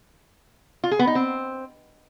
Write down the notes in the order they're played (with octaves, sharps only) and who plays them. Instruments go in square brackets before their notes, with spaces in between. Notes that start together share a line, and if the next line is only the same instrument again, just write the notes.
[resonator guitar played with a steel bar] F4
G#4
B3
D#4
C4